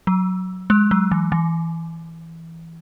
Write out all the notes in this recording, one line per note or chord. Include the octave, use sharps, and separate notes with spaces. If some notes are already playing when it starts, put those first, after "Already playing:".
F#3
G#3
F#3
E3
E3